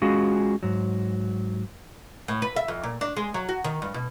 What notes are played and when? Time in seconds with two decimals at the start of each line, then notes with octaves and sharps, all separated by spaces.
0.02 G#3 C#4 F4 F#4 G#4
0.63 G#2 F#3
2.28 A2
2.42 B4
2.56 E5
2.68 F2
2.83 A#2
3.01 D4
3.17 G#3
3.34 F#3
3.49 F#4
3.64 D#3
3.82 G2
3.94 B2